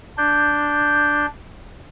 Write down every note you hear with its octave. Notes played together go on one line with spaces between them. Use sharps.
D4 G6